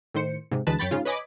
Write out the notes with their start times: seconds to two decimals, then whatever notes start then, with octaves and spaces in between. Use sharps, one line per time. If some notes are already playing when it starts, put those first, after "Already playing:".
0.14 A2 D#3 C5 C#7
0.51 G#2 C3
0.67 D2 E3 G#3 B4 A5
0.79 F#2 C#5 G5 B5 A6
0.91 G#2 C#3 F4
1.05 B4 C#5 D#5 G#5 B5 D6